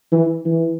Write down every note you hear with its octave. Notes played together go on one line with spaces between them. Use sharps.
E3
E3